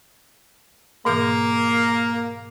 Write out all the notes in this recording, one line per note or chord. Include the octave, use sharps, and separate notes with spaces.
G#2 B2 E3 A#3